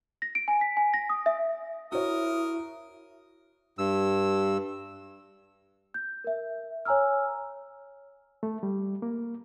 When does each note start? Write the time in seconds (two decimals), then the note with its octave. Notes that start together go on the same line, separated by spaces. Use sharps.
0.22 A#6
0.35 D7
0.48 G#5
0.61 B6
0.77 G#5
0.94 A#6
1.10 D#6
1.26 E5
1.92 E4 F#4 A#4 C#5 D#6
3.78 G2 E6
5.94 G6
6.24 A#4 E5
6.85 C#5 G#5 A#5 E6 F6
8.43 A3
8.63 G3
9.02 A#3